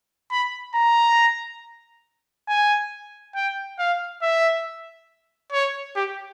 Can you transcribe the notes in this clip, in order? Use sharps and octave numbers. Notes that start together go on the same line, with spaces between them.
B5
A#5
G#5
G5
F5
E5
C#5
G4